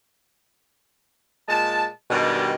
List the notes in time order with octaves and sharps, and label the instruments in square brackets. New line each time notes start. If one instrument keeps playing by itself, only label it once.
[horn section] A#2 G#3 A5
G2 B2 D#3 G3 G#3